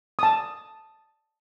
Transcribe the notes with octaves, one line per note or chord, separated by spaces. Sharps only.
A5 D#6